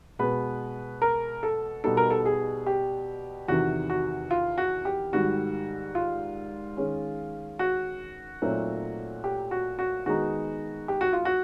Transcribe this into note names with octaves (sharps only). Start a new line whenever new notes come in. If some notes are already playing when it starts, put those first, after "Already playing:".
B2 G#3 B3 B4
A#4
A4
B2 G3 B3 D#4 A4
A#4
A4
G#4
G4
E2 C3 D#3 F#4
F#4
F4
F#4
G4
G#2 D#3 G3 F#4
F4
D#3 G#3 C#4
F#4
A#2 F#3 A3 C4 D#4
G4
F#4
F#4
D#3 G#3 B3 D#4 F#4
G4
F#4
F4
F#4